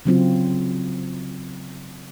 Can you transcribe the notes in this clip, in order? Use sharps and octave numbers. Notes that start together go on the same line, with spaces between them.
C#3 F#3 C4 F4